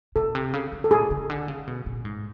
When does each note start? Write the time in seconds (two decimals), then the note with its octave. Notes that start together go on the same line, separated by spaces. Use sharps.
0.16 B2 A4
0.35 C3
0.53 C#3
0.72 D3
0.84 A4
0.91 A#2 G#4
1.11 C#3
1.30 D3
1.48 C#3
1.67 B2
1.86 A#2
2.05 G#2